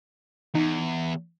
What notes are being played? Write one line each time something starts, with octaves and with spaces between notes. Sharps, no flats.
E2 D#4